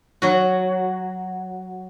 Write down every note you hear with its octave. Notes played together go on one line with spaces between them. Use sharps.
F#3 F#4